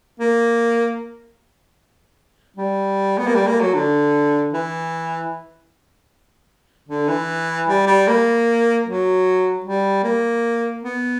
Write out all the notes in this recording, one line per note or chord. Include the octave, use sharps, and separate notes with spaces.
A#3
G3
B3
A#3
G3
A#3
F#3
D3
E3
D3
E3
G3
G3
A#3
F#3
G3
A#3
B3